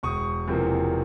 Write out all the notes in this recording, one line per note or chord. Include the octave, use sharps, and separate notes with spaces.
E1 C#6 D#6
E2 C3 F3 A#3